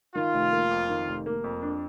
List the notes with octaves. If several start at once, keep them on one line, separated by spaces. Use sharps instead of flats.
D#3 F4
F1
A#3
F2
D#3
F1
A#3
F2
D4